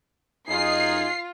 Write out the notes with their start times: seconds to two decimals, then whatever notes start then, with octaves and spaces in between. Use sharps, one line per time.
0.48 F#2 D#4 F4 G#4 C7